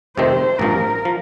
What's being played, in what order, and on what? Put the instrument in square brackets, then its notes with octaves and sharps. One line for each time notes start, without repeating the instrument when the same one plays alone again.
[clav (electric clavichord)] F2 C3 D#3 A3 C4 [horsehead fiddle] C5
[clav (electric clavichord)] A1 G2 F3 [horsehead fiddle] A#4
[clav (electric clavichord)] F3